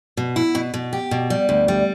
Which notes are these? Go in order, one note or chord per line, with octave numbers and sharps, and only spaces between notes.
B2
E4
B2
B2
G4
B2
G3
D2
G3